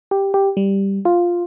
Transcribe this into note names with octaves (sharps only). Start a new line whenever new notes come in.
G4
G4
G3
F4